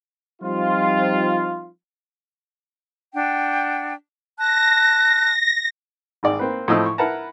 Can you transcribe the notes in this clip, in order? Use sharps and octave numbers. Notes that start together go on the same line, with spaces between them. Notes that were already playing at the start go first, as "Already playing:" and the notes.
F3 G3 C4 D#4 F4
D4 F#5 G5
A5 F#6 A#6
G#1 G#4 D5 G5
A#3 C4 B4
A2 F3 C4 D#5 B5 E6
C#6
E4 A#4 B4 F#5 A5 A#5